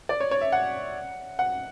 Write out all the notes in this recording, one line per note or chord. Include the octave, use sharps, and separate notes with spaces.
D5
C#5
C#5
E5
F#5
F#5